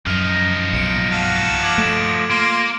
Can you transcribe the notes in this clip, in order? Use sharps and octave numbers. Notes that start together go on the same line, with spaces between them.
F#2 F3 D#4 F6
B1 C#7 D7
F#4 F5 A5
D6 G#6 F#7
A3 D7 E7
A#3 F4 C6